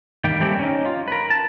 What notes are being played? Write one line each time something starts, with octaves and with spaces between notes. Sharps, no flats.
D#3 G3 A#3 G5
G3 A3 C4 C#4 E4 G4
C#4 D#4
F4
A#4 B4
A5